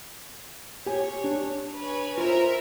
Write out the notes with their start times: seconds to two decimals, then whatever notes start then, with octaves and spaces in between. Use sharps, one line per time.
0.86 G4 C#5 G#5
1.24 D4
1.76 B4 C#5 G#5
2.18 F4 A#4 C5 E5